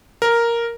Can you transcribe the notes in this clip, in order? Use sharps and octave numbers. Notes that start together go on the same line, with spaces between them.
A#4